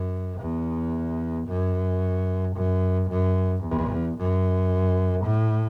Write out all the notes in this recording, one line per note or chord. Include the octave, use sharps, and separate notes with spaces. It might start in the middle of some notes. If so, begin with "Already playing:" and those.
Already playing: F#2
E2
F#2
F#2
F#2
E2
F#2
A2